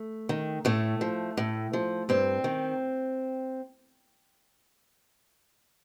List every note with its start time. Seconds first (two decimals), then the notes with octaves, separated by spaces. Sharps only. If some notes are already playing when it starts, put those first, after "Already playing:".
Already playing: A3
0.29 D#3
0.65 A2 A3
1.01 F3
1.37 A2
1.73 F3
2.09 G2 C4
2.44 D#3